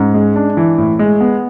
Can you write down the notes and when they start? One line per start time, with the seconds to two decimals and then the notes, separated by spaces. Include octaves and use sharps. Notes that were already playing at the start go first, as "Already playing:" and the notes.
Already playing: G#2 C#4
0.14 G#3
0.36 D4
0.57 E3
0.78 A2
0.99 G#3
1.21 B3